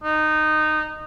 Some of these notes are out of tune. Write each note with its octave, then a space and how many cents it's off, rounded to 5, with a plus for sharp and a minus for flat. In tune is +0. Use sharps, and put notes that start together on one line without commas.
D#4 -15